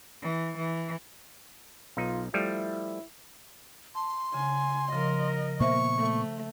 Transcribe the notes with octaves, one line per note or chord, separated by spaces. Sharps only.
E3
E3
B1 D#4 F4
F3 G3 A3 E4
A5 C6
C#3 G#5
C#3 F3 A#4 D#5
A#2 A#3 B3 C5 E5 C#6
A3